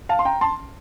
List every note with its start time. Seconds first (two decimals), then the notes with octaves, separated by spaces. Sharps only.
0.09 F5 A5
0.19 C6
0.25 G5 A#5
0.41 A5 C6